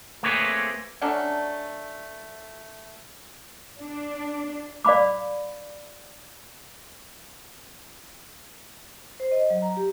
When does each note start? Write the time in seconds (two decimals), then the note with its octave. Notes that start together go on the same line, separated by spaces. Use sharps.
0.23 A3 A#3 C4 G#4 B4 C#5
1.02 F#3 A3 C#4 D4
3.80 D4
4.85 D5 F5 B5 D6
9.20 C5
9.32 D#5
9.50 F#3
9.62 A#5
9.77 G4